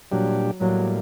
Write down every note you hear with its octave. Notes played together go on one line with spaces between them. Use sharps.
A#2 F#3 G3 D4 G4
A2 F#3 G3 A#3